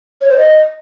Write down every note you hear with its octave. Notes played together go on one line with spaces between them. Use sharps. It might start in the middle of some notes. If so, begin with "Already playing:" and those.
C#5
C5
D#5